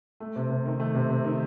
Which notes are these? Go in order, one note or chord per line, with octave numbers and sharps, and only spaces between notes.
A3
C3
C3
D#3
A3
C3
C3
D#3